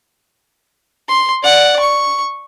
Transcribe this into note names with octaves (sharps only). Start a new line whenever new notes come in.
C6
D5 F#5
C#6